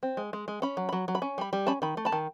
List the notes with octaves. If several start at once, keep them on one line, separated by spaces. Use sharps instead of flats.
C4
G#3
G#3
G#3
C#4 B5
F#3
F#3 B5
F#3
B5
C#4
G3 B5
G3
C#4 A5 B5
D#3 B5
A3
A5 B5
D#3